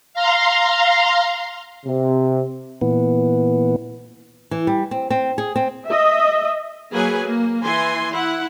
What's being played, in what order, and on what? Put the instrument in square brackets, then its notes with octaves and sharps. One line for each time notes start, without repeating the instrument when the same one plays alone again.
[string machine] F5 A#5 C6
[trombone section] C3
[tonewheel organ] A#2 E3 B3
[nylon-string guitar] E3
G3
C4
C4
G#4
C4
[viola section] D#5 E5
F#3 A#3 G#4 B4 G#5
A#3
E3 G#5 C6
E4 F#5